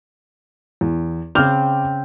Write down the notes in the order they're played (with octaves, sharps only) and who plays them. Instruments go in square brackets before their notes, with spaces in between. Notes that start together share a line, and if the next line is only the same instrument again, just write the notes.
[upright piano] E2
[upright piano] C#3 F7 [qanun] C4 [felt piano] D6 F6 G6